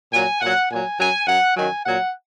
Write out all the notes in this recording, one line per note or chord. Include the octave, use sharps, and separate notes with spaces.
A#2 F#3 G#5
A#2 F#3 F#5
A#2 F#3 G#5
F#2 F#3 G#5
F#2 F#3 F#5
F#2 D#3 F#3 G#5
A#2 F#3 F#5